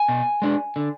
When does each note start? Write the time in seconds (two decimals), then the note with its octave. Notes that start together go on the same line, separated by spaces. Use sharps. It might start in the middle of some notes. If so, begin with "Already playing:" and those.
Already playing: G#5
0.08 B2
0.42 G#3 D4
0.76 D3